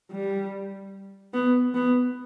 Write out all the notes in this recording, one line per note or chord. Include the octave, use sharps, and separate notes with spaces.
G3
B3
B3